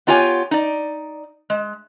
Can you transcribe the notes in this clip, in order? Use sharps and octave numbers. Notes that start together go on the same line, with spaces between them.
B3 D4 F4 G4 C#5 G#5
D#4 D5
G#3